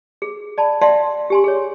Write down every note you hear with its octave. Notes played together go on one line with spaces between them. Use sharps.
G#4
D5 A5 B5
D5 E5 F5 G5 A5 C6
G4 G#5 C6
G#4 C#5